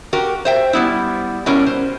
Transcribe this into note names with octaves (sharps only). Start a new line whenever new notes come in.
F#4 G4 A#4
C5 E5 G5
G3 B3 E4
B2 G3 C#4 E4 A#4
C5